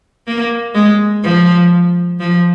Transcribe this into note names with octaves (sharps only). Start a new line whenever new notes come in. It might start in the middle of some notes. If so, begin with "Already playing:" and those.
A#3
G#3
F3
F3